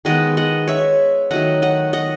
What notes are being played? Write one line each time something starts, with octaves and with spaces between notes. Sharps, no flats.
D#3 G#3 B3 D#5 F#5
D#5 F#5
C#5 E5
D#3 F#3 A3 D#5 F#5
D#5 F#5
D#5 F#5